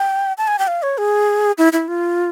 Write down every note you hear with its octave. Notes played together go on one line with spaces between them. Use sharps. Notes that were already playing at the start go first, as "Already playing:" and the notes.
Already playing: G5
A5
G#5
G5
F5
C#5
G#4
E4
E4
F4